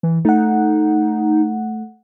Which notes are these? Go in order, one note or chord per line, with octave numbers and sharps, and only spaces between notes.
E3
A3 D#4 F#5